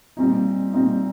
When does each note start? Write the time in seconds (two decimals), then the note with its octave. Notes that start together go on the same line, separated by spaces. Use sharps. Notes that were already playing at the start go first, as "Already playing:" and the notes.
0.17 A#2 G3 C4 D#4
0.73 A#2 G3 C4 D#4